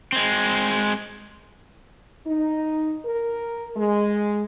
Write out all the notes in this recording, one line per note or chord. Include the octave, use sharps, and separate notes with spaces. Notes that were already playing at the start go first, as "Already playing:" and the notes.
G#3 C4
D#4
A#4
G#3